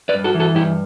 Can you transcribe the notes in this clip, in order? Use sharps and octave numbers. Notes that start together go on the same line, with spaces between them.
B4 D5
G2
F#4 A4
E3
F#4 A4
G2 E4 G4